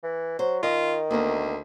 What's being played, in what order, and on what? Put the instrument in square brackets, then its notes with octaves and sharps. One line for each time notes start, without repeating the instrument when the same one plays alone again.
[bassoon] E3
[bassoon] F#3 [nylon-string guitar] C5
[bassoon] D#3 [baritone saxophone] F4 [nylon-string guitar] D#5
[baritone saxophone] D2 [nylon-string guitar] A#3 B3